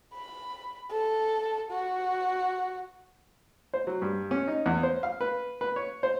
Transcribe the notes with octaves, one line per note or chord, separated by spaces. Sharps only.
B5
A4
F#4
C5
F#3
G2
C#4
D#4
E2
C5
F5
B4
B4
C#5
C5